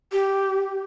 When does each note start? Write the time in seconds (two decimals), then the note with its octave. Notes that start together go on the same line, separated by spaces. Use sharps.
0.12 G4